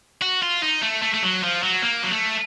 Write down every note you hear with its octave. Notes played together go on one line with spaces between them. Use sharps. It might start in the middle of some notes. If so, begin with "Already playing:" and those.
F#4
F4
D#4
A3
A3
A3
F#3
F3
F#3
A#3
F#3
A3